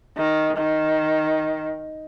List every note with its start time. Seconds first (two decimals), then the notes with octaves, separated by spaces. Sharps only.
0.17 D#3
0.57 D#3